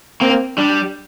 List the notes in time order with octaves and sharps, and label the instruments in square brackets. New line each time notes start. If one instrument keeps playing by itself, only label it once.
[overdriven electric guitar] A#3 [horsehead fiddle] C4
[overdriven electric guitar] G3 [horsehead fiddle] D4